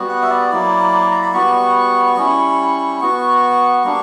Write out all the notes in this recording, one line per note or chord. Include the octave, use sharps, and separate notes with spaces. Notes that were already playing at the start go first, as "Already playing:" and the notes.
Already playing: G3 B3 F#4
F#5
E5
D5
F#3 A#3 E4
A#5
B5
G3 B3 F#4 C#6
G3 C#4 E4
B3 F#4 C#6
G3 A#3 D4